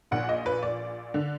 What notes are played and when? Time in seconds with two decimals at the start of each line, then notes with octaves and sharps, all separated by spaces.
0.11 A#1 A#2 F#5
0.29 D#5
0.46 B4
0.63 D5
1.14 D3